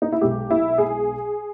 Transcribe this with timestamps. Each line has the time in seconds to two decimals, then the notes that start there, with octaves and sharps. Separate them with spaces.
0.02 D#4
0.12 E4
0.21 B1 B2 G#3 G4
0.50 E4
0.78 G#4